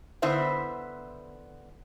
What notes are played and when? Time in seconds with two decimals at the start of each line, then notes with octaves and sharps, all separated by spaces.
0.22 D3 B3 E4 C5 E5